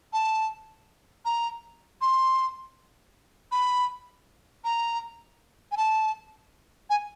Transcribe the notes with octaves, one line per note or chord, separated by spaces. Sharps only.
A5
A#5
C6
B5
A#5
G#5
A5
G#5